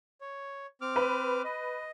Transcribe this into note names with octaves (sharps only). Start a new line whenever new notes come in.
C#5
C4 D6 F6
B4
D#5